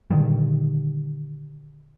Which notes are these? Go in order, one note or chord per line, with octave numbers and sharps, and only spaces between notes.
A#2 D3 D#3 G3